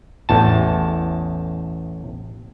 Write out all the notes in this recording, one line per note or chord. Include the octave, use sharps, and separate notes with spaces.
A1 E2 A5